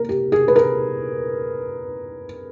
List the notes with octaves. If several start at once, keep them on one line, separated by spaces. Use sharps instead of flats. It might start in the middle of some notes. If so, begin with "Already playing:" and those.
Already playing: A#3 A#4
G4
G#4
B4
A#4